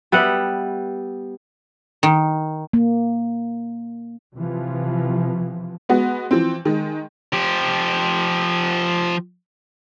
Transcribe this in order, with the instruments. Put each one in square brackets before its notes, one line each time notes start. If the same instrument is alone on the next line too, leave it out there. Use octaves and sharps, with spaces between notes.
[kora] G3 B3 E5 F#5
[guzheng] D#3
[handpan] A#3
[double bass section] C3 E3 F3
[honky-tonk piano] G#3 B3 F#4
E3 F3 C4
D#3 G#3
[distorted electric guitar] F3 G4